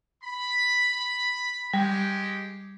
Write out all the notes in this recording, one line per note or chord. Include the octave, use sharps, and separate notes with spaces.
B5
G3 G#3 G4